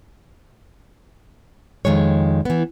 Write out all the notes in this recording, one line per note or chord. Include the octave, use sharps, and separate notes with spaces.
F2 D#3 G#3 C#5
E3 B3